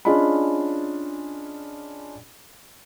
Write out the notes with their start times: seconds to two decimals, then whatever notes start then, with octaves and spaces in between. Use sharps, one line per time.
0.05 C#4 D4 F4 G#4 D#5 B5